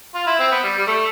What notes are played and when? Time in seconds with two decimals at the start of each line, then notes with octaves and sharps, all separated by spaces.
0.14 F4
0.26 E4
0.39 C4
0.51 B3
0.63 G3
0.78 G3
0.87 A3